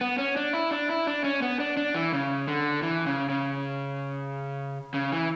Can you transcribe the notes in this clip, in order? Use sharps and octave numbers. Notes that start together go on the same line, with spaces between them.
B3
C#4
D4
E4
D4
E4
D4
C#4
B3
D4
D4
E3
C#3
D3
E3
C#3
C#3
C#3
E3